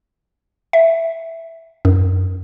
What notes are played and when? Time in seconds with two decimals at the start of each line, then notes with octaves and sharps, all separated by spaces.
0.73 E5
1.85 F#2